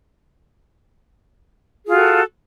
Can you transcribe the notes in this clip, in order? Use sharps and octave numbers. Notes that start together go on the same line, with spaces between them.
F4 F#4 G#4 A4